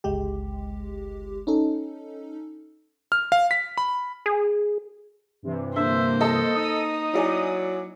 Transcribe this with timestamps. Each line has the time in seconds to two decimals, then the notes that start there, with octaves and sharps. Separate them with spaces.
0.04 G1 C#2 G#3 G4
1.47 C#4 D#4 A4
3.12 F6
3.32 F5
3.51 B6
3.78 B5
4.26 G#4
5.43 G2 C3 E3
5.76 D3 A#3 C5 E5
6.21 A4 D#5 A5
6.55 D#4 D#6
7.14 F#3 E4 D5 G#5